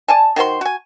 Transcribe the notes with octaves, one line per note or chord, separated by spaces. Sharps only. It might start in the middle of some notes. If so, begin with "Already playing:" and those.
D5 G#5 A5
D#3 F#4 C5 C6
F#4 G#5